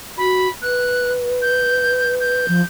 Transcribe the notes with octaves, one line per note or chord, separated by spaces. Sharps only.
F#4 B5
B4 F#6
G6
G6
F3